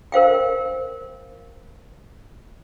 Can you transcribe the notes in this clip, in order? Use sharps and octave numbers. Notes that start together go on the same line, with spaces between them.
A#4 C5 F5 G5